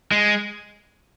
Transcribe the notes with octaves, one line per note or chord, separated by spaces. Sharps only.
G#3